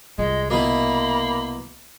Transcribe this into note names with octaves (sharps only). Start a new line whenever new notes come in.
C2 G#3 F4 D#5
B2 E3 A#3 B5